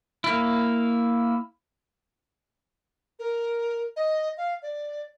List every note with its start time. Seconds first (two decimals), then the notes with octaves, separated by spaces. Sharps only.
0.24 A#3 E4
3.19 A#4
3.96 D#5
4.37 F5
4.62 D5